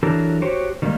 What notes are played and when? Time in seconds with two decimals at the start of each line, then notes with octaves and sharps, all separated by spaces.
0.03 E3 F#3 D4 G4 A4 A#4
0.42 F#4 G4 C5 C#5
0.82 D#3 G3 G#3 A#3 D#4